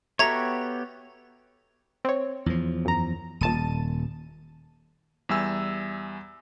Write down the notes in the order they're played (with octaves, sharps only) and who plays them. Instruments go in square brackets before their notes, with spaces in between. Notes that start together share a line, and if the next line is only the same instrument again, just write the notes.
[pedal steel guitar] B3 G4 C#5 [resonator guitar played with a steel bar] F#4 A4 E5 [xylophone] A#5 G#6
[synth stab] C4 C#5
[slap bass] E2 F3
[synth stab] F#2 A#5
[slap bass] D#1 [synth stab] A#1 A5 D#7
[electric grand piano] E2 G3 E5 G#5 E6